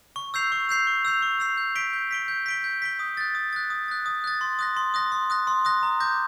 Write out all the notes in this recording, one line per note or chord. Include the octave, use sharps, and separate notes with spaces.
C#6
E6 G6 C7 F7
C#6
E6 G6 C7 F7
C#6
E6 G6 C7 F7
C#6
E6 G6 C7 F7
G6
B6 D7 G7
G6
B6 D7 G7
G6
B6 D7 G7
G6
B6 D7 G7
D#6
F#6 A6
D#6
F#6 A6
D#6
F#6 A6
D#6
F#6 A6
C6
D#6 F#6 A#6
C6
D#6 F#6 A#6
C6
D#6 F#6 A#6
C6
D#6 F#6 A#6
A#5
D6 G6 A#6